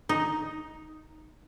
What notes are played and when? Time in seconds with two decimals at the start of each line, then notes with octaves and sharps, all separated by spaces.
0.09 D#4